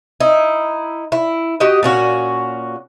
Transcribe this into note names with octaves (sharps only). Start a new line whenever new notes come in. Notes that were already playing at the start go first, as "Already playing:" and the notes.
D#4 E4
E4
F#4 G4 D#5
A#2 C#4 F#4